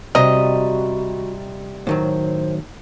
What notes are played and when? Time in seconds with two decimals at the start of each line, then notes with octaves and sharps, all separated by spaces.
0.15 C3 G3 F#4 D#5 A#5
1.87 A2 D#3 F#3 C5